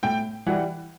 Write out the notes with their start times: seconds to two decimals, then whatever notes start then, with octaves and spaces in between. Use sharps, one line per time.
0.03 A2 G5
0.46 E3 G3 F#5